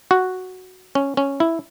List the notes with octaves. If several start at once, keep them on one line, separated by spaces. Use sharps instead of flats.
F#4
C#4
C#4
E4